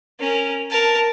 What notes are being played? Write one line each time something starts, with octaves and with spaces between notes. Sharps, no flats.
C#4 A#4
A#4 A5